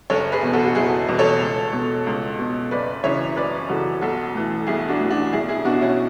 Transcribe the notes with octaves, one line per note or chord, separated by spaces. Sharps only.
F#1 A4 C#5
G#4 B4
E2 B2
F#4 A4
F#4
F#1 E4 G#4
E2 B2
A4 C#5
C#2
B2
C#2
B2
F#1 B4 D5
F#2 C#3 E3 C#5 E5
F#1 B4 D5
F#2 C#3 E3 F#4 A4
B1 F#4 A4
A2 E3
B1 E4 G#4
D4 F#4
A2 E3
D4 F#4
B1 E4 G#4
E4 G#4
B2 D4 F#4
C#4 E4